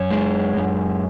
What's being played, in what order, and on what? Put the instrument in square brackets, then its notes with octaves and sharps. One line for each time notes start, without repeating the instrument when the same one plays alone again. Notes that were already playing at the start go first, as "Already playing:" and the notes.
Already playing: [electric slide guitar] F#2 C#5
G#3
F#2